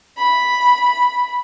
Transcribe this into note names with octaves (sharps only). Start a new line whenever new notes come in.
B5